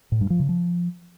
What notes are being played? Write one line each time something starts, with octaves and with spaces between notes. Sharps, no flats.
A2
G2
F3
C#3
F3